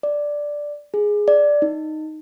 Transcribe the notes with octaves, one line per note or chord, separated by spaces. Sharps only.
D5
G#4
D5
D#4